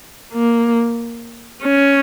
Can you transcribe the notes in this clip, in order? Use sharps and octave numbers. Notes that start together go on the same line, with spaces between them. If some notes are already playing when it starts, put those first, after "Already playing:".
A#3
C#4